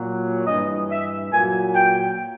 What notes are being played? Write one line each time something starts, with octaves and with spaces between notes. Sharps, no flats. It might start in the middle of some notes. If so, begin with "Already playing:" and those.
Already playing: A#2 F#3
G2 E3 D#5
E5
A#2 G#5
F#3
G5